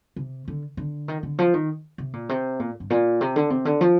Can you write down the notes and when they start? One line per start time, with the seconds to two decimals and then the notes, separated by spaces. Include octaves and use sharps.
0.16 C3
0.48 D3
0.77 D3
1.08 D#3
1.23 D3
1.39 F3
1.54 D#3
1.98 C3
2.13 A#2
2.29 C3
2.59 A#2
2.80 G2
2.90 A#2
3.21 C3
3.36 D3
3.50 C3
3.65 D3
3.81 F3